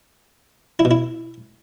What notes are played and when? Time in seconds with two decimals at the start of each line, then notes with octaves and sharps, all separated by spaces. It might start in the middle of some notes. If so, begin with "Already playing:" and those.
0.79 E4
0.85 B2
0.91 E4